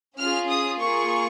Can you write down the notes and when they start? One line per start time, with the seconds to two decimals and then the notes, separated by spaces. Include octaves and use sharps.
0.18 C#4 F4 G#4 F6
0.49 D#6
0.80 A#3 F4 G#4 C#6